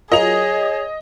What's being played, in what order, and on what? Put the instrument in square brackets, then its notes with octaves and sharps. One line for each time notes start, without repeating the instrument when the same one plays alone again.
[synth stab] F#3 F4 A#4 [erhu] G#4 [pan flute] C#5 [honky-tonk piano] D#5 F7